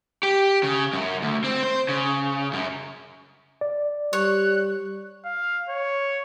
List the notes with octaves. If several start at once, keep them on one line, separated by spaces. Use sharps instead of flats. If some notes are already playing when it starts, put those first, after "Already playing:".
G4
C#3
F#2
D2
C4
C5
C#3
F#2
D5
G3 C#5 F#6
F5
C#5